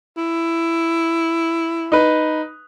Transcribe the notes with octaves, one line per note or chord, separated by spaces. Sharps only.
E4
D#4 B4